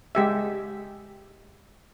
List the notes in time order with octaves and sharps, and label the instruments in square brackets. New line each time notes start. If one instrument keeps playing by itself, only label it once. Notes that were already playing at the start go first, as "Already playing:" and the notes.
[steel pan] G#3 G4 E5